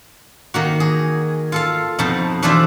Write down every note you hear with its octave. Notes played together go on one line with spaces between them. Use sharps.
D#3 A#3 F#4
G#4
F4 A4 F5
F2 B2 D#4 A5
E3 A3 D4 F4 C5 E5